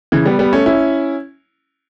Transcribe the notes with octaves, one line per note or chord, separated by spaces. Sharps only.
C#3 E3
G3 B3
G3 B3
A3 C#4
C#4 E4